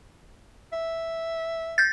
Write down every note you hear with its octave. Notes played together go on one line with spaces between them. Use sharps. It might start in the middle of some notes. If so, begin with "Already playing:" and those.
E5
G6 A6